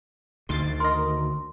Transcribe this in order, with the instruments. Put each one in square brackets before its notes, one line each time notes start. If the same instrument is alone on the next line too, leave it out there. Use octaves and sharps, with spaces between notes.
[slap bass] D2 D3 D#3 [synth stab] C6 A6
[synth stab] A#4 D#5 [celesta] C6